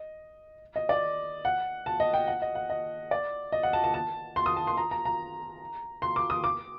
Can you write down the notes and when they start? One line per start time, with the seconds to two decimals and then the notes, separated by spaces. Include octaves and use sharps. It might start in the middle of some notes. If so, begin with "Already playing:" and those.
Already playing: D#5
0.76 D#5
0.89 D5
1.45 F#5
1.86 A5
2.00 D#5
2.14 G5
2.27 F#5
2.42 D#5
2.55 F#5
2.70 D#5
3.11 D5
3.52 D#5
3.63 F#5
3.73 A5
3.84 A5
3.94 A5
4.36 C6
4.46 D#6
4.57 A5
4.67 C6
4.77 A#5
4.91 A#5
5.05 A#5
6.02 C6
6.16 D6
6.30 D#6
6.44 D6